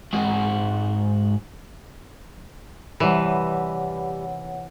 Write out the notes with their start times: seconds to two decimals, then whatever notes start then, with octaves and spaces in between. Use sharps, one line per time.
0.13 G#2 F#4
3.00 C3 E3 G3 B4 C#5 F#5